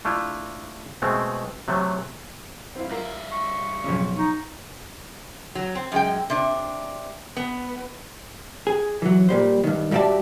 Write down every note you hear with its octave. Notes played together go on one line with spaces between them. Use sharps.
A3 D4 E4 F4
B2 G#3 A3 C4
C3 F#3 A3
C4 E4 F5
G2 F4 A#4 E5 F5
C#6
B1 F2 C#3
D#4 C#6
F#3
C4
F#2 G#3 G5
C3 D4
B3
G#4
E3 F#3
A#2 G3 C5
G2 D#3
G2 G3 F#4 D5 E5 A5